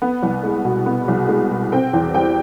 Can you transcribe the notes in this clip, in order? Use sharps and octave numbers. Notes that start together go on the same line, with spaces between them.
B3
C2
G#3
B2
B3
C2
G#3
B2
C4 G5
E2
G3 G5